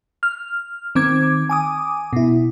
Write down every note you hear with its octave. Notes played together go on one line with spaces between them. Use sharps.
F6
D#3 C4 D6 G#6
G#5 D6 D#6
B2 E4